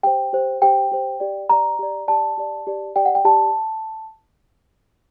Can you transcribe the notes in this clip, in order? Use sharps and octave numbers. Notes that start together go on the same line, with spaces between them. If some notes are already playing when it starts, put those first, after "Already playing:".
G4 C5 G5
G4 C5
G4 C5 G5
G4 C5
G4 D5
G4 D5 A#5
G4 D5
G4 D5 A5
G4 D5
G4 D5
G4 D5 G5
F#5
G5
G4 D5 A5